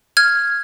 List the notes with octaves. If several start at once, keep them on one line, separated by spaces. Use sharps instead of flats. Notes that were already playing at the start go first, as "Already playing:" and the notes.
F6 G#6